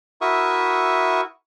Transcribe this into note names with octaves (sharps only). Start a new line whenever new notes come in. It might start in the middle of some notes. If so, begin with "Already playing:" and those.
E4 F#4 A#4 E5 C#6 D#6